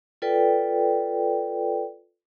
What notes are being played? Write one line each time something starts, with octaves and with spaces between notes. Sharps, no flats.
F4 A4 B4 D5 G5